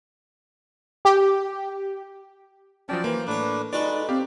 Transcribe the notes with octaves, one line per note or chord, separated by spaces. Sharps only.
G4
F3 F#3 C#4 D5 G5 A5
E3 A#3 C5
A2 D4 B4 C#5 D6
G#3 D#4 F4 F#4 A4 B4 D5
C4 G4 D5 F5